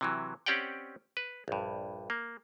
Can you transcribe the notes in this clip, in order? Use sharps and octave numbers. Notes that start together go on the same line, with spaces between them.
C3 E3 F#3
C4 C#4 G4 D5 F#5 G5
B4
A#1 G2
A#3